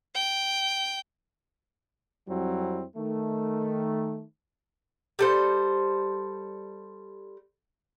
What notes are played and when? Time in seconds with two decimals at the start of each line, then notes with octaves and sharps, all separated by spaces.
0.15 G5
2.27 F2 F#3 G3 C4 E4
2.96 D#3 A3
5.19 G3 A4 C5